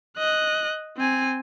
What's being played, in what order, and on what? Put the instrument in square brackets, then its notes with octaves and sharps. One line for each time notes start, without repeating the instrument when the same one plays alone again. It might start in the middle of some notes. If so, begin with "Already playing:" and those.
[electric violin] D#5 F#6
C4 G#5